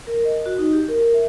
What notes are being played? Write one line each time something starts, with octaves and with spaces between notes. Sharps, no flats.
A#4
D#5
F#4
D#4
G4
A#4
E5